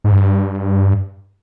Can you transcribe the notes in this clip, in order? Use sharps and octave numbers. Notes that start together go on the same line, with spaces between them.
G#2
G2